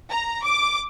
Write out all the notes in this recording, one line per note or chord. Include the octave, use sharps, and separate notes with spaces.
A#5
D6